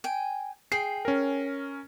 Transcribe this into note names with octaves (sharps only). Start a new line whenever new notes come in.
G5 G#5
G#4 G5 C7
C#4 A#4